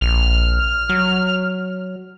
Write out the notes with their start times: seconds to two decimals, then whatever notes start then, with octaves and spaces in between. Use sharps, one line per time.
0.01 A#1 F6
0.89 F#3